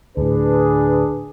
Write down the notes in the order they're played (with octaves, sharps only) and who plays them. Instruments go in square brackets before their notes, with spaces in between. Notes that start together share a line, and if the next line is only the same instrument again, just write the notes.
[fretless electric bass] D2 A2 [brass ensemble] D4 G#4 B4